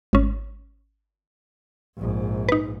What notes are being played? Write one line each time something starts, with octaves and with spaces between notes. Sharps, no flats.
G#1 C#4
A#1 G#2
D#4 B4